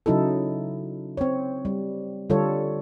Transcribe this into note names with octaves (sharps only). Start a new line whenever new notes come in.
C#3 F#3 D#4 E4 A4
C4 C#5
G3
D3 G3 F4 A4 C#5